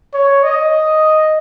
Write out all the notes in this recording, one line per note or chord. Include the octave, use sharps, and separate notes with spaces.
C#5
D#5